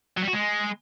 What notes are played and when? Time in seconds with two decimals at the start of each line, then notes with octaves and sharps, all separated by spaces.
0.17 F#3
0.22 G3
0.28 F#4
0.33 G#3